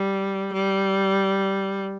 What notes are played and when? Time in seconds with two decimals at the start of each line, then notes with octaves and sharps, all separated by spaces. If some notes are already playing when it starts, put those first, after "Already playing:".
Already playing: G3
0.53 G3